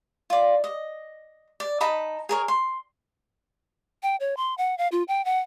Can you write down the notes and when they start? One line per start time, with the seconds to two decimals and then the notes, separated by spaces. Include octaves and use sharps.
0.30 F4 D5
0.64 D#5
1.60 D5
1.80 D#4 A5 B5 D#6
2.29 G#4 A#4 C#5
2.48 C6
4.02 G5
4.20 C#5
4.37 C6
4.58 F#5
4.78 F5
4.92 F4
5.08 G5
5.25 F#5